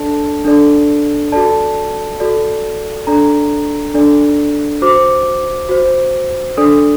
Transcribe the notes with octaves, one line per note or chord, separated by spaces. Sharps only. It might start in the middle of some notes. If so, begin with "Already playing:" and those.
Already playing: D4 A4 D5 A5
D4 A4 D5
F#4 A4 D5 A5
F#4 A4 D5
D4 A4 D5 A#5
D4 A4 D5
F#4 C5 D6
F#4 C5
D4 A4 D5 D#6